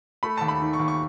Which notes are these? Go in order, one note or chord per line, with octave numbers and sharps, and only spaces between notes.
A3 B5
D#2 A5
B5
D#3
C#6
D#2
C#6